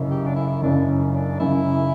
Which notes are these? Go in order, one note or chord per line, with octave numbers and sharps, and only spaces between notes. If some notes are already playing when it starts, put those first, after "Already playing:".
Already playing: F#1 F#2 C#3
G4
D4
E4
F#1 F#2 C#3 D4
C#4
D4
F#1 F#2 C#3 E4